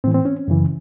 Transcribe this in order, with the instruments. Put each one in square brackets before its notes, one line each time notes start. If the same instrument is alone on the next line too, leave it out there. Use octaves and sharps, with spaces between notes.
[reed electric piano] A2 E3 C4
C4
C#4
F#2 C#3 E3